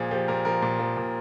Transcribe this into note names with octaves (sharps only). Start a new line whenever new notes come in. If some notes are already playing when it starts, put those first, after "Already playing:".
Already playing: A#2 F3 G#4
F3 G4
A#2 A#4
F3 A#4
A#2
F3
A#2